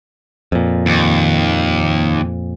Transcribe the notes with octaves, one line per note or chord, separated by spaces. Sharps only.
F2 A#2
D#2